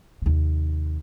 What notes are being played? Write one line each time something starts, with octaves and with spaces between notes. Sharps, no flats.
D#2 C3